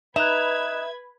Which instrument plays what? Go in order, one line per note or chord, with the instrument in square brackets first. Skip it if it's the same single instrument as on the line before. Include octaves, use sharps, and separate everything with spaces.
[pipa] D#4 [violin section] B4 B5 G#6 [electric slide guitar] E5 [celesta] F#6 E7